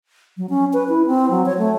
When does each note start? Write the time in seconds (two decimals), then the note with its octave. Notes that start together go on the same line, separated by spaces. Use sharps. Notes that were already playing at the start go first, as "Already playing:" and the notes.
0.37 F#3
0.50 C#4
0.73 B4
0.89 E4
1.07 C4
1.31 F#3
1.46 C#5
1.58 A3